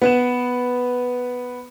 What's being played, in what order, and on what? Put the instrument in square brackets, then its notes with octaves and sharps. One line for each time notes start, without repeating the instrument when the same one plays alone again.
[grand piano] B3 B4 E7